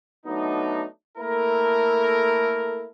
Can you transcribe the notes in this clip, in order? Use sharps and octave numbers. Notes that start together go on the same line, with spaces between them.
F#3 A3 B3 D4 D#4
A3 A#3 E4 A4 A#4